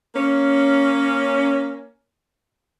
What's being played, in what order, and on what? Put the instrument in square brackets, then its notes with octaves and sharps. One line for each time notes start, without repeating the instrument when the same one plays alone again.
[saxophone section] A#3 C#4